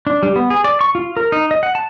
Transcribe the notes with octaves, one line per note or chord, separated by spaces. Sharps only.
D4
G3
B3
G#4
D5
C#6
F4
A#4
D#4
D#5
F#5
A5